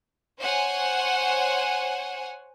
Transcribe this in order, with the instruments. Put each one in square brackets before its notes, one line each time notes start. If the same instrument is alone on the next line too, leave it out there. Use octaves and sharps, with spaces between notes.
[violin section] C5 C#5 F#5 G#5